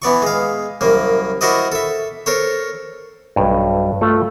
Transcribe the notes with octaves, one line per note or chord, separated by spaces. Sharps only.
E3 B3 D5 C#6
G#3 F5
C2 F#2 A#3
E4 F#4 A#4 C5 D5 D#5
A4 E5
A4 A#4 C5 C#5
B1 G2
A3 F4 A4